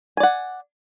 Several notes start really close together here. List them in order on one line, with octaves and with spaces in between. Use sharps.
G#5 D5 F#5